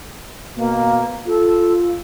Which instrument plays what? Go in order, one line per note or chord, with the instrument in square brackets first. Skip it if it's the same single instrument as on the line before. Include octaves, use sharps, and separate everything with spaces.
[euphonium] B2 [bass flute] A#3
[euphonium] F4 [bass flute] A4